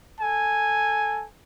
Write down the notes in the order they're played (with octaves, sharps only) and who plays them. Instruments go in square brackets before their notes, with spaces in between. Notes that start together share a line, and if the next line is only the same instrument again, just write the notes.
[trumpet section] A4 G#5